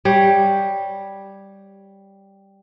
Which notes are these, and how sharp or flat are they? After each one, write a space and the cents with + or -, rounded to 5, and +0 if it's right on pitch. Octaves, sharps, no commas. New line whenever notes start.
G3 +0 C#5 +0